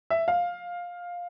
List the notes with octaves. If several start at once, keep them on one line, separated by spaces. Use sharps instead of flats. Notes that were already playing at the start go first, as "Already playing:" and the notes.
E5
F5